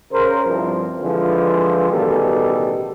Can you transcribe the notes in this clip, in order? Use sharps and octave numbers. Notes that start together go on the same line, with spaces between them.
C#3 A#4 C5
C2 G2 F3
D3 E3 F3 G#3 F4
A1 B2 D#3 G3 G#4 A4